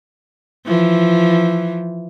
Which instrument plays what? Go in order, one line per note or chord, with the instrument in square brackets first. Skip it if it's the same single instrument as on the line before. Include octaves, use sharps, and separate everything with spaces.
[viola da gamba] E3 F3